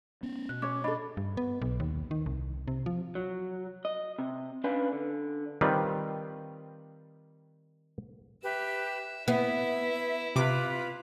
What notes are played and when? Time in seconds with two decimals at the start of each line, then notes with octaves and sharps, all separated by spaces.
0.23 B3 C#4
0.49 B2 F#6
0.62 C#4 C#5 D6
0.84 D4 A4 D#5 B5
1.17 G2
1.37 B3
1.62 B1
1.80 D#2
2.11 D#3
2.26 C2
2.68 C3
2.86 F3
3.15 F#3
3.85 D#5
4.19 C3
4.64 C#4 D4 B4 F5 G#5
4.93 D3
5.61 D#3 G3 C4 F4 B4 D5
8.43 G4 B4 E5
9.28 B3 E4 E5
10.36 C3 F4 B4 B5 D6